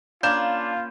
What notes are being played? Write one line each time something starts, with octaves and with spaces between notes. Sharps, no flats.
A#3 C#4 D4 F4 B5 G6 E7